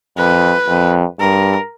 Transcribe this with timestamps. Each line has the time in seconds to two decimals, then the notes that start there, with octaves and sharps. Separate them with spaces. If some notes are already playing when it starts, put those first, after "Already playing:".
0.17 F2 B4
0.68 F2
1.20 G2 A#4